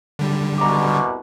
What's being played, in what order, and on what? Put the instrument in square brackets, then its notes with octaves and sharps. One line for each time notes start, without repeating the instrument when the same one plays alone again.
[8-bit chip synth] D3 G3
[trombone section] C2 B2 [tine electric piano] A#5 D6